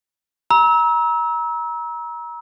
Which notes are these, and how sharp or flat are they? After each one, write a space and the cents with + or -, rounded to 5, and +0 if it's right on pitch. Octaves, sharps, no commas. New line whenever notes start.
A#5 +30 E6 -25